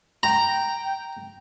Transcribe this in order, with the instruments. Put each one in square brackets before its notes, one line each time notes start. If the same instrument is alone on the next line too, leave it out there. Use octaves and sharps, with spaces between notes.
[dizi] G5 [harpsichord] A#5